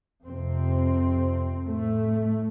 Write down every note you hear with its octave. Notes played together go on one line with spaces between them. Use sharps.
F2 C3 C4
A2 A3